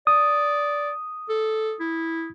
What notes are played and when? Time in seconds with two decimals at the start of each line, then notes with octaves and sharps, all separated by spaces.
0.07 D5 D#6
1.29 A4
1.80 E4